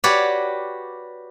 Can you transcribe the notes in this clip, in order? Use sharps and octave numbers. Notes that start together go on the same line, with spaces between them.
F#4 G4 B4 C#5 D5